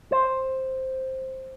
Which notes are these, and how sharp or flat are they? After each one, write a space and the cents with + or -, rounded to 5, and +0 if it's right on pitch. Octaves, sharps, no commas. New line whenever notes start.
C5 +5